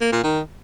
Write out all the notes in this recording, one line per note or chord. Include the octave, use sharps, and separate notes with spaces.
A#3
A#2
D#3